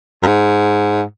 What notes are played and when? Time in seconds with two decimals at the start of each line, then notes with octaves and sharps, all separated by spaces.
0.23 F#2
0.26 G#2